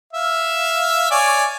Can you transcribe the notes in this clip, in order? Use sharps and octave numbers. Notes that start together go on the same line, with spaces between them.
E5 F5
C#5 D5 G#5